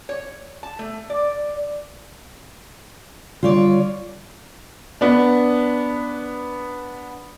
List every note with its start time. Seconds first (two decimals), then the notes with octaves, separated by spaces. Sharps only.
0.09 C#5
0.63 A5
0.79 A3
1.10 D5
3.43 D3 G3 F4 C#5 D5
5.01 B3 D4